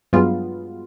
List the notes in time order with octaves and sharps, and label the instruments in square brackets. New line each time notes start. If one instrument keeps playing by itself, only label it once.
[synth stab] G2 F#3 G#3 B3 F4